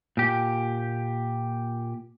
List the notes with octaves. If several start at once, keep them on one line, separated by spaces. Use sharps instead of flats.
A#2 G4